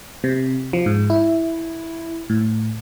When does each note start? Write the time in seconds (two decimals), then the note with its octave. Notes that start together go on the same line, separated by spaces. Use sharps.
0.24 C3
0.73 F3
0.86 G#2
1.10 E4
2.30 A2